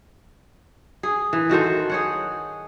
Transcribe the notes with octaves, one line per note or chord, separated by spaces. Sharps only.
G#4
E3
D#3 F#4 A4 C5
G#4 C#5 F#5